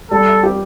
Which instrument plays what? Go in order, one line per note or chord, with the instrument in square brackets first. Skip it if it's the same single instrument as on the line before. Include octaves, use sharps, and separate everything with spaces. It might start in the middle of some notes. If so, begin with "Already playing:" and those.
[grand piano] G3 [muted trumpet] A4
[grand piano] G4